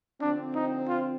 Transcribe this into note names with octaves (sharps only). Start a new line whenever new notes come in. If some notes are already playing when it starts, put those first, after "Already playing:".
D3 F3 C4 D4
D#4
F4